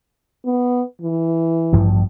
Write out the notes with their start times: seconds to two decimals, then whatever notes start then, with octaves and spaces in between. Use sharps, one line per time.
0.46 B3
1.02 E3
1.72 A1 G2 F3